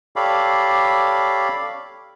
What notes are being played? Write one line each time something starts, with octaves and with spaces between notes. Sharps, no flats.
G4 A4 C#5 D5 F5 B5